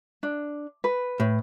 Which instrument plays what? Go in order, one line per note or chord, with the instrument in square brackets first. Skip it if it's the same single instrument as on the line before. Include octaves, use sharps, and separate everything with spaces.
[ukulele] D4
B4
[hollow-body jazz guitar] A2